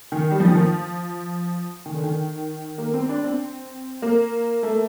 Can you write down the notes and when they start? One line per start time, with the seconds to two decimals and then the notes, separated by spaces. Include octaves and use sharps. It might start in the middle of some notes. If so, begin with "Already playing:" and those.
0.12 D#3
0.31 G3
0.40 F3
0.48 D#3
0.55 F3
1.86 D#3
1.94 D3
2.04 D#3
2.78 A#3
2.94 C4
3.09 D4
3.24 C4
4.02 A#3
4.63 A3